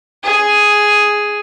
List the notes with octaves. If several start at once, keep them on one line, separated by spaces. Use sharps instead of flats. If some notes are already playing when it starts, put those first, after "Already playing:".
G#4